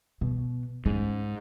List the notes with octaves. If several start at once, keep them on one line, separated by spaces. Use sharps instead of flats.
B2
G#2 C#4